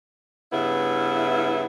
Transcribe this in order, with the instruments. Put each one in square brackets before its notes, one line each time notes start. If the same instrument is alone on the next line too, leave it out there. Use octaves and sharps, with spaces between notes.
[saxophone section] G2 C#3 B3 E4